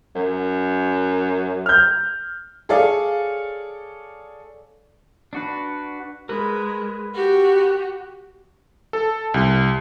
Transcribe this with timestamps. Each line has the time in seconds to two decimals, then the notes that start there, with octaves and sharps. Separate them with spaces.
0.15 F#2
1.66 F6 G6
2.69 G#4 A4 C#5 D5 F5
5.33 D4 F#4 B4
6.29 G#3 A#4 B4 B5
7.14 F#4 G4
8.93 A4
9.34 C2